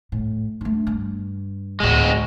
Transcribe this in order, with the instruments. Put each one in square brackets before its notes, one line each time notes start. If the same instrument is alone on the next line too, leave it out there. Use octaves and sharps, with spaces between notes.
[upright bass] A2
A3 D4
G2
[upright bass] D2 A2 [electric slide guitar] G#3 F#4